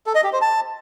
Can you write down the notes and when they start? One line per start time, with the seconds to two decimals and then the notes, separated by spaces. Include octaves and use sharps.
0.06 A4
0.15 D#5
0.24 G4
0.33 C5
0.41 A5